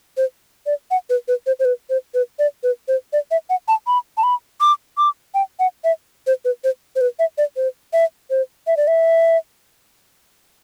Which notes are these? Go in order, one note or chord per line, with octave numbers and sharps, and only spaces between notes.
C5
D5
F#5
B4
B4
C5
C5
B4
C5
B4
D5
B4
C5
D5
E5
F#5
A5
B5
A5
B5
D6
D6
G5
F#5
E5
C5
B4
C5
C5
B4
E5
D5
C5
E5
C5
E5
D5
E5